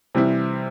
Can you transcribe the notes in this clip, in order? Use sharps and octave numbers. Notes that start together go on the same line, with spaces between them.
C3 E3 G3 C4 E4